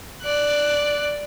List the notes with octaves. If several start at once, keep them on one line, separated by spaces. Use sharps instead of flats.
D5 F#6